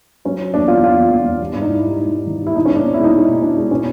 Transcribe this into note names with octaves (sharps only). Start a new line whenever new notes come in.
F#3 C#4
F#3
E2 D4
E2 F4
E2 F4
E2
E2
E2
G3
G#2 D4
D#4
G#2 E4
G3
G3 D#4
G3
D#3
G3
E4
B2 D#4
C#4
G#3
D4
B2
E4
G#3
D#4
G#3
B2
B2 D4
G#3
B2 C#4